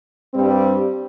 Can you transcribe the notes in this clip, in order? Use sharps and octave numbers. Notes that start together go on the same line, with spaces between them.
G2 G3 C4